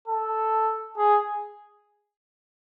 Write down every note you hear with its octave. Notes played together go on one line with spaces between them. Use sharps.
A4
G#4